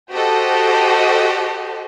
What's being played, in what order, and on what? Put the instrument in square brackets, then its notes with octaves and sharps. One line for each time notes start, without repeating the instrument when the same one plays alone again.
[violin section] F#4 G4 A4 C5 D#5